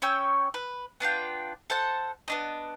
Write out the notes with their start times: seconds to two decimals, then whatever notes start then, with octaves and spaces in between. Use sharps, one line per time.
0.02 C#4 C#5 G5 E6
0.54 B4
1.00 B3 D4 F4 G5
1.70 A4 C5 F#5 A5
2.28 B3 D4 D#5